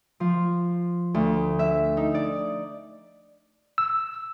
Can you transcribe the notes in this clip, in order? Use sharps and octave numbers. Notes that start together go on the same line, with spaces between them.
F3
D2
E5
D#4
D5
E6